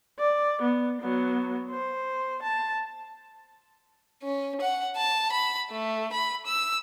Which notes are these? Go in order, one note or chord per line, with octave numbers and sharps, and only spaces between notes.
D5
B3
F#3 B3
C5
A5
C#4
F#5
A5
B5
A3
B5
E6